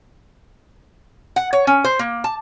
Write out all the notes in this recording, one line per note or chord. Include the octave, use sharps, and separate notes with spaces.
F#5
C#5
C#4
C5
A#3
A5